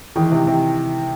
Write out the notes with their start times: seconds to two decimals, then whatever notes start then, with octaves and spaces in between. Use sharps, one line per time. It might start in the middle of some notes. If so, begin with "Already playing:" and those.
0.16 D#3 E3
0.31 C3
0.47 C3